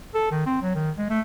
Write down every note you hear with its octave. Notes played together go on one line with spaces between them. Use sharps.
A4
D#3
C4
F#3
D#3
G#3
A3